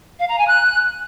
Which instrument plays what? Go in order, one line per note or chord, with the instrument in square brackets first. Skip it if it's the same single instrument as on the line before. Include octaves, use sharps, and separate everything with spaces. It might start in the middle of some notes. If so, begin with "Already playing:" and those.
[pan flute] F5
A#5
G#5
F#6